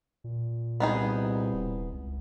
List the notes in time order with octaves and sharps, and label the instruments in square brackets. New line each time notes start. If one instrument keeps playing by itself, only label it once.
[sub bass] A#2
[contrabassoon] C2 [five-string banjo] B3 D#4 G#4
[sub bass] D#1
C#2